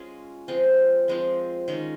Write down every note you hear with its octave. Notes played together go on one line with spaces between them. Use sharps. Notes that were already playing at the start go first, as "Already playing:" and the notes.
Already playing: G#3 C#4 F4 G#4
F3 G#3 C4 F4
F3 G#3 C4 F4
D#3 G#3 C#4